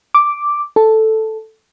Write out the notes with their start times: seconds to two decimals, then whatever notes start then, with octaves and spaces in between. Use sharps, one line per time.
0.15 D6
0.76 A4